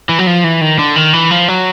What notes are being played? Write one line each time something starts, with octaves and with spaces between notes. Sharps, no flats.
E3
F#3
F3
E3
D#3
D3
D#3
E3
F3
F#3